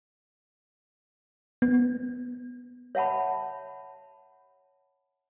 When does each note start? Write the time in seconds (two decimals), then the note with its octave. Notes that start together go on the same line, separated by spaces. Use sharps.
1.62 B3
2.95 C#5 E5 F#5 A5 B5